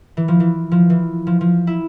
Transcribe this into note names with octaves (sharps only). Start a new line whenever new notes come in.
E3
F3
E3
F3
E3
F3
F3
E4